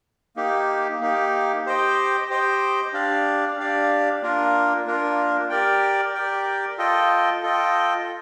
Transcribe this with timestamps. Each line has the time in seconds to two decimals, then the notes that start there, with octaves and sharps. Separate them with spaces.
0.36 A#3 D#4 G4
1.01 A#3 D#4 G4
1.65 G4 C5 D#5 G5
2.30 G4 C5 D#5 G5
2.93 D4 G4 D5 F5
3.58 D4 G4 D5 F5
4.22 A#3 D4 F4 A#4
4.86 A#3 D4 F4 A#4
5.50 G4 A#4 D5 G5
6.15 G4 A#4 D5 G5
6.78 F4 A4 D#5 G5
7.42 F4 A4 D#5 G5